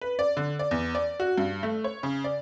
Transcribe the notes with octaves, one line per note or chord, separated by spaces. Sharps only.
B4
D5
D3
D5
E2
D5
F#4
G2
A3
C#5
C#3
D5